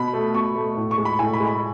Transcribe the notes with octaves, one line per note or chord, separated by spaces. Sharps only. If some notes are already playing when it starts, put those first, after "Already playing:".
Already playing: B2 B5
A3
B2 C#6
A3
A2
C#6
G#3
B5
A2 G#5
B5
G#3
B5